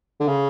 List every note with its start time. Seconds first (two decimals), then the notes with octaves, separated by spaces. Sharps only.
0.20 D3
0.28 C#3